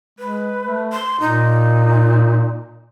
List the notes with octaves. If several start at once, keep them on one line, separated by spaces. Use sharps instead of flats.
G#3 B4
A3
C6
A#2 D#4